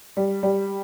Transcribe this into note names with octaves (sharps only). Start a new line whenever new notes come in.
G3
G3